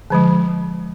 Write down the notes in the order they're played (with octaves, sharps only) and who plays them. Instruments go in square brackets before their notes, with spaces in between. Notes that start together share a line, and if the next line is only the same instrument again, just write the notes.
[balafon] D3 F3 G#3